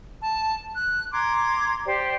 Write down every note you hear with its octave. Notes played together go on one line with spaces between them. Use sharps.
A5
F#6
A#5 C6 D6 G#6
G4 C5 D5